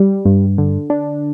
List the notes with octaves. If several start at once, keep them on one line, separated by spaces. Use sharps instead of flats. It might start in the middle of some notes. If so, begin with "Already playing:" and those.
Already playing: G3
G2
D3
D4